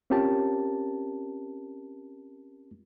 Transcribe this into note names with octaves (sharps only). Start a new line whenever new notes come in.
C4 C#4 F4 G4 A#4 A5